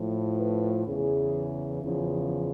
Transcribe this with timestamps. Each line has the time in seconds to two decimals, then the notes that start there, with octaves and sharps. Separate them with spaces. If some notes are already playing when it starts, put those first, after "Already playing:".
Already playing: A2 F3
0.38 B4
0.86 E2 C#3 E3 G#4
1.82 E2 C#3 F3 G#4